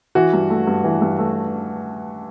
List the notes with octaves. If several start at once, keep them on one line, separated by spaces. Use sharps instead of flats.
E3 F#4
G2
A3
G2
E3
G2
A3